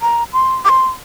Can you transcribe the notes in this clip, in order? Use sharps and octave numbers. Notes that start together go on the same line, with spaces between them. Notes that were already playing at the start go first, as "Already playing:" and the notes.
A#5
C6
D6
C6